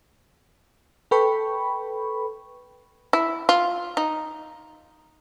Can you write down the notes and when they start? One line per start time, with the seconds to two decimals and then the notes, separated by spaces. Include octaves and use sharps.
1.11 A4 B4 G5 B5 C#6
3.13 E4
3.49 F4
3.97 D#4